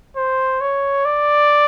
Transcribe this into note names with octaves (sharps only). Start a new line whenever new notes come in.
C5
C#5
D5